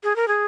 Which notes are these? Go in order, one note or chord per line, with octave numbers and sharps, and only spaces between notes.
G#4
A#4
G#4